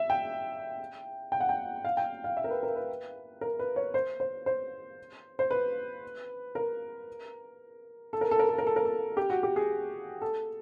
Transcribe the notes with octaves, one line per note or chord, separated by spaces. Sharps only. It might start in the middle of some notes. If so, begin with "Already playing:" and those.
Already playing: E5
G5
G5
F#5
G5
F5
G5
F5
E5
A#4
B4
A#4
B4
A#4
B4
C#5
C5
C5
C5
C5
B4
A#4
A4
A#4
A4
A#4
A4
A#4
A4
A#4
A4
G4
F#4
G4
G#4
A4